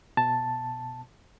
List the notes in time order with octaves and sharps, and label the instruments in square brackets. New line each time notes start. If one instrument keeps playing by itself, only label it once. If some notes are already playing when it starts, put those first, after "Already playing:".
[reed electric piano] B2 A5